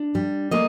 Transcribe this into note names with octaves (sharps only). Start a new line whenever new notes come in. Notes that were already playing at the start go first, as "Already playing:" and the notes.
Already playing: D4
G3
A#3 D#5